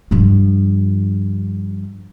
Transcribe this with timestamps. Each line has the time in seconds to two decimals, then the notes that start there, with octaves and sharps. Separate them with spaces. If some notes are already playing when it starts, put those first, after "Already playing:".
0.11 G2 F3